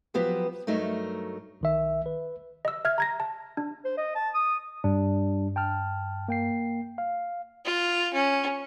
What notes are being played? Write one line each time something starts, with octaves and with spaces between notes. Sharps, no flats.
F3 F#3 B3 G4 B4 C5
G2 F#3 A3 D#4 A#4
B1 D#3 E5
B4
D#5 E6
E5 F6 G#6
A#5 G#6 A#6
A5
D4
C5
D#5
A5
D#6
G2 G3 D4
G5 A5 F6
A#3 G5 C7
F5
F4
C#4